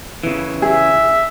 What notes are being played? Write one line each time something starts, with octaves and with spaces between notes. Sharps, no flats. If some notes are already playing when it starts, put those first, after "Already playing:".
C#3 E3
G#4 E5